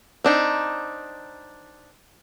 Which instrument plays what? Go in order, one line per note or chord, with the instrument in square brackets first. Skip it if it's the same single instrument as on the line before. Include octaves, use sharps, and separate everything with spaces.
[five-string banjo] C4 D4 D#4